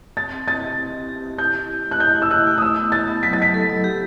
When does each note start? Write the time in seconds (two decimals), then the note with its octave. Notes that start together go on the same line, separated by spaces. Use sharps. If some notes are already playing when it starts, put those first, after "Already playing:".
0.16 C4 A6
0.32 C4
0.47 E4 A6
0.62 G4
0.78 C4
0.93 G4
1.09 G4
1.24 G4
1.38 E4 G6
1.55 E4
1.70 E4
1.85 A3
1.91 F#6
2.00 E4 G6
2.16 E4
2.22 E6
2.31 A3 F#6
2.47 A3
2.58 D#6
2.62 E4 E6
2.77 B3
2.92 E4 A6
3.08 B3
3.23 F#3 B6
3.33 A6
3.38 F#3 B6
3.54 A4
3.69 F#3
3.84 G4